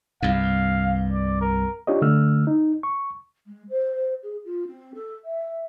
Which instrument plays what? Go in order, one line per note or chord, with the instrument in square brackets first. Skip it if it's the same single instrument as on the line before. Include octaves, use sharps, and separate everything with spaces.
[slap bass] C2 G2 [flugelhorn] F5
[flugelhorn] D5
A#4
[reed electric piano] D4 F4 G4 C#5 D#5
D3 A3 E6 F6
D#4
C#6
[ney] G#3
C5
G#4
F4
C4
A4
E5